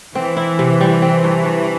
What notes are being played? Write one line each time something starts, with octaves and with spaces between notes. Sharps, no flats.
E3 C4
E4
C3
G3
C4
G2
G2